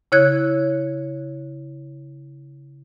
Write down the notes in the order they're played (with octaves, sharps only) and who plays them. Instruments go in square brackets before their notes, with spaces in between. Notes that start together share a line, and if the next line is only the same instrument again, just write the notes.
[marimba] C#3 E4 C#5 F#6 G#6